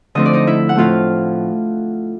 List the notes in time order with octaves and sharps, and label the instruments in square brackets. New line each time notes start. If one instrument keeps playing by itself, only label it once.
[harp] D3 F3 A3 C4 D#5
D5
D#4 D#5
E4 E5
F#5
A2 F3 A3 C4 F4 F5